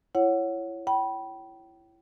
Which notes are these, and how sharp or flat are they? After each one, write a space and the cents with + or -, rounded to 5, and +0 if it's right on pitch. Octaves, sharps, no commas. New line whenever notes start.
E4 +30 C#5 +0 F#5 +0
G5 -30 B5 -25